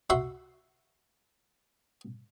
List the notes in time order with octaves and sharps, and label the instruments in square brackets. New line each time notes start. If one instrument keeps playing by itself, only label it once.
[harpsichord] F#4 E5 C6